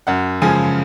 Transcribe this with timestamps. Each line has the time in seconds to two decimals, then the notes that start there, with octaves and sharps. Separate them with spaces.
0.07 F#2 F#5
0.42 C#3 F3 G#3 G#5